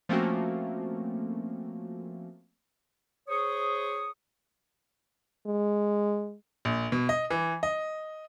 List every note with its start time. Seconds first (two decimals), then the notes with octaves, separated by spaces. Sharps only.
0.09 F3 A3 A#3 C4 C#4 F#4
3.28 G#4 C5 C#5 C#6 D#6
5.46 G#3
6.65 A#1
6.92 B2
7.09 D#5
7.30 E3
7.63 D#5